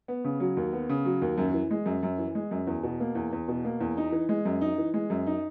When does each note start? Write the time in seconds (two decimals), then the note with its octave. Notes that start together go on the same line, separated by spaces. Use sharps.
0.08 B3
0.25 C#3
0.40 F#3
0.57 D#2
0.73 B3
0.89 C#3
1.05 F#3
1.22 D#2
1.38 F#2
1.54 E3
1.71 G#3
1.86 F#2
2.03 F#2
2.19 E3
2.35 G#3
2.51 F#2
2.67 E2
2.83 B2
3.00 A#3
3.15 E2
3.33 E2
3.48 B2
3.65 A#3
3.81 E2
3.97 D#4
4.12 E3
4.29 G#3
4.45 F#2
4.61 D#4
4.78 E3
4.94 G#3
5.10 F#2
5.27 D#4